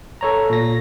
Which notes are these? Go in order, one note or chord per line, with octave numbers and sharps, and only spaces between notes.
A4 C#5 A#5
A#2 A#6